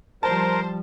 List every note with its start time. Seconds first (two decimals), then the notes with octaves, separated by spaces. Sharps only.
0.23 F3 G3 A#4 C5 A5